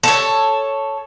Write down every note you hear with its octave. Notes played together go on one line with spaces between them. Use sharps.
A4 C#5